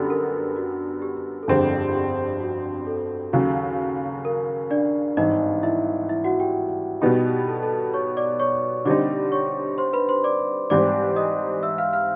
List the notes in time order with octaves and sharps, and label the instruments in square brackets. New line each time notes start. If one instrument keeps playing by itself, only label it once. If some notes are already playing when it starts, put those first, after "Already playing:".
Already playing: [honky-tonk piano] F#2 D3 G3 B3 [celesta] A4
[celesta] A#4
F#4
G4
A4
[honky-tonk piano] G1 F2 D3 G3 C4 [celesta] G#4
[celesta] G4
F#4
A4
[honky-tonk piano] D#2 C#3 F#3
[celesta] A#4
D4 D5
[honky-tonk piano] G#1 G2 E3 [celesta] D#4 D#5
[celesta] E4 E5
E4 E5
F#4 F#5
G4 G5
[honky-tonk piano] B2 G3 B3 D#4 [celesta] G4 G5
[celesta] A4 A5
A4 A5
C#5 C#6
D5 D6
C#5 C#6
[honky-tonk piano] D3 G3 C4 D#4 [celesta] D5 D6
[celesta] C#5 C#6
C5 C6
B4 B5
C5 C6
D5 D6
[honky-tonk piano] G#2 E3 G3 C4 [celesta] D5 D6
[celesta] D#5 D#6
E5 E6
F5 F6
F5 F6